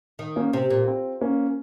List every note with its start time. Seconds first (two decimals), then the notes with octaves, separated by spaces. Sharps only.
0.19 D#3
0.36 A#3 C#4
0.53 C3 C4
0.70 A#2
0.88 C4
1.21 A#3 C#4